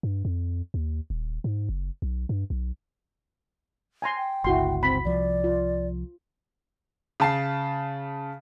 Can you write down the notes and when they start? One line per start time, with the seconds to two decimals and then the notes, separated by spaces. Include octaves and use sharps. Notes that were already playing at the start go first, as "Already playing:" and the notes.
0.03 G2
0.25 F2
0.74 D#2
1.10 D#1
1.44 G#2
1.69 F#1
2.02 B1
2.29 G2
2.50 B1
4.02 G#5 A#5 C6
4.17 G5
4.44 G1 C#2 E4 F#4 C6
4.83 C4 B5
5.05 C2 F3 D5
5.44 F4
7.20 C#3 A5 C7